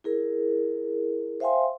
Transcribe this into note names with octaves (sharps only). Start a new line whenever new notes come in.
E4 G#4 A#4
C5 E5 F5 G5 G#5 C6